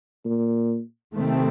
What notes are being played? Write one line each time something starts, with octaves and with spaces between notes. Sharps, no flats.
A#2
C3 D#3 A3 C4